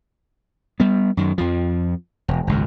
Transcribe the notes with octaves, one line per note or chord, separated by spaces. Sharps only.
G3 B3
F#2 D#3
F2 F3
E1
G#1 C#2 F#2